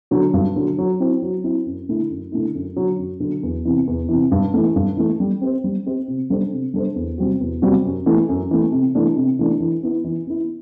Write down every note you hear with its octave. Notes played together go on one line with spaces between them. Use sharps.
D3 F#3
G2
D3 F#3
F#3
C4 E4
F#3
C4 E4
F#2
D3 A3 E4
F#2
D3 A3 E4
F#2
D3 F#3
F#2
D3 F#3
E2
C3 E3
E2
C3 E3
G2
E3 A3
G2
E3 A3
G3
C4 G4 C5
G3
C4 G4 C5
C3
G3 D4 A4 C5
C3
G3 D4 A4 C5
E2
C3 G3 C4 F#4
E2
C3 G3 C4 F#4
F#2
E3 A3
F#2
E3 A3
C3
E3 A3 D4
C3
E3 A3 D4
E3
B3 E4
E3
B3 E4